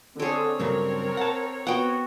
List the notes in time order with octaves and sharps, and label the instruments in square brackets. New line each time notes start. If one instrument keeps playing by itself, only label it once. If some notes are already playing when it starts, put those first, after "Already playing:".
[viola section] D3 [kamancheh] C4 C#5 [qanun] G#4 A4
[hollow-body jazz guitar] G2 C#3 F#3 [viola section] A#4
[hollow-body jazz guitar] F#5 A5
[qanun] B3 F#4 [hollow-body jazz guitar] F#5 G5